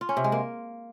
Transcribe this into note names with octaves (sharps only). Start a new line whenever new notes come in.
F4
C#4
C3
G#3
A#3